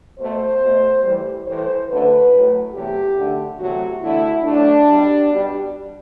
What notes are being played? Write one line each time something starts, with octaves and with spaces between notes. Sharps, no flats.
B2 A3 C5
B2 A3
A2 E3 G3
A2 E3 A3 C5
F#2 D3 F#3 A3 B4
A2 F#3 A3
E2 C3 F#3 A3 G4
F#2 D3 A3
E2 C3 F#3 A3 F#4
E2 D3 A3 E4
A2 F#3 A3 D4
B2 G3
B2 G3